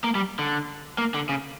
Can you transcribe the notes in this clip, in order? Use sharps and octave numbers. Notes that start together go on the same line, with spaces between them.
A#3
G3
D3
A#3
D3
C#3